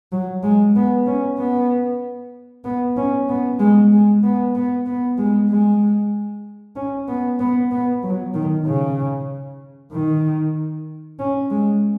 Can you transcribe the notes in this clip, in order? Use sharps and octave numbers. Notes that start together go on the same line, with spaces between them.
F#3
G#3
B3
C#4
B3
B3
C#4
B3
G#3
G#3
B3
B3
B3
G#3
G#3
C#4
B3
B3
B3
F#3
D#3
C#3
D#3
C#4
G#3